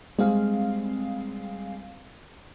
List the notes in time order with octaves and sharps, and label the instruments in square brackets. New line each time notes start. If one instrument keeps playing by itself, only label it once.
[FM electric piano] G3 C4 F5 [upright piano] G#3